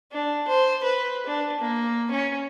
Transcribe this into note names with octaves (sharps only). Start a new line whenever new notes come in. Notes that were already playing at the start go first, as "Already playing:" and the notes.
D4
C5
B4
D4
A#3
C#4